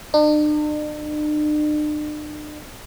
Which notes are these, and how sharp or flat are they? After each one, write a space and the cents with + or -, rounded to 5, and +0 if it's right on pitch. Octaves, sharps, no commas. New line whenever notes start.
D4 +45